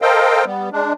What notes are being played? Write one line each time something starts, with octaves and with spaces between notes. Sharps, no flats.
A4 A#4 C5 D#5 F5 G5
G3 B3
G#3 D4